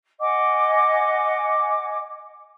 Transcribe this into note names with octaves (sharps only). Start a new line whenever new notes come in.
D#5 F#5 G#5 D6